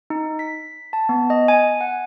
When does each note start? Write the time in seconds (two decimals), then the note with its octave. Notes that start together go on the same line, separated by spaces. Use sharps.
0.10 D#4
0.39 B6
0.93 A5
1.09 B3
1.30 D#5
1.48 G#5
1.81 F#5